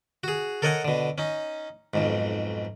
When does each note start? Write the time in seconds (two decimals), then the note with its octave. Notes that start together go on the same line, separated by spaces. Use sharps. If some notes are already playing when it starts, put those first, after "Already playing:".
0.24 F#4 G#4
0.62 A4 A#4 C#5 D#5 F#5 G#5
0.85 B2 D3
1.18 C#4 D#4
1.94 B1 F2 G#2